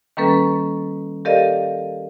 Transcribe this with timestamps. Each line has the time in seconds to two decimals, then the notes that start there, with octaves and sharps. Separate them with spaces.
0.17 D#3 G3 A#3 C#4 A4 B4
1.25 G4 A4 A#4 D5 D#5 F5